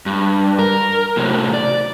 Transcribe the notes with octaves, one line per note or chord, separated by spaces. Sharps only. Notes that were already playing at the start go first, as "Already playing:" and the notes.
G2
A#4
A2 C3 F#3
D5